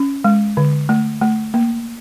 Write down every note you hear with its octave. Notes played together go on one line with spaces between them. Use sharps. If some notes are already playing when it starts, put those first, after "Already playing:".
Already playing: C#4
G#3
D3
A3
A3
A#3